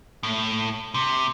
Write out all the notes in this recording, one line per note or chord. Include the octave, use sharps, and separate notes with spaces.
A2
C3